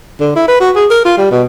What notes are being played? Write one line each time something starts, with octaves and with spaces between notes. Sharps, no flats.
D3
E4
B4
F#4
G#4
A#4
F4
G3
B2